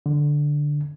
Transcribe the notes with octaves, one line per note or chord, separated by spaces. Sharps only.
D3